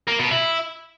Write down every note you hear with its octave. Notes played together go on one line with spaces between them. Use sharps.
A#3
B2
E4